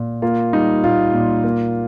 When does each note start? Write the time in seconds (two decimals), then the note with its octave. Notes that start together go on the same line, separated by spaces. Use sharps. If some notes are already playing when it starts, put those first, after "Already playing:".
Already playing: A#2
0.22 A#3 F4
0.53 G3 D#4
0.84 A#2 F4
1.14 A#2
1.44 A#3